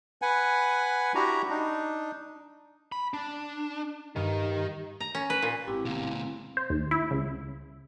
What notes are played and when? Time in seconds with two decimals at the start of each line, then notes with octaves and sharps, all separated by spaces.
0.22 B4 F#5 G#5
1.15 D4 E4 F#4 G4 A#5
1.50 D4 D#4
2.92 B5
3.14 D4
4.16 G2 D#3
5.00 A#5
5.15 C#4
5.30 B4
5.42 A#2
5.67 G#1 C4 E4 G4
5.85 D2 B2 A#3
6.57 C5
6.70 D#2
6.91 E4
7.11 C#2